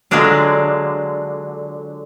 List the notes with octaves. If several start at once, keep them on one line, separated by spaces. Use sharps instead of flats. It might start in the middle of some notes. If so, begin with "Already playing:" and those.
D3 F#3 G#3 D4 F4